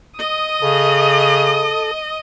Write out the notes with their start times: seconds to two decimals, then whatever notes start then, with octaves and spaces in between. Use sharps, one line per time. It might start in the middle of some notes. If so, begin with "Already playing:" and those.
0.19 D#5 D#6
0.62 C#3 A4